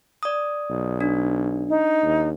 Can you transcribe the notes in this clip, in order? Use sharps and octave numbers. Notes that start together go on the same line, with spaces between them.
D5 D#6
B1
D4
D#4
D#2